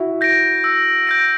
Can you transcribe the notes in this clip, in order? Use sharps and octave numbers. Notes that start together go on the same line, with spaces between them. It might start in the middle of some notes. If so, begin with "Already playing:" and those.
Already playing: E4 F#4
G6 A#6 D7
E6
G6 A#6 D7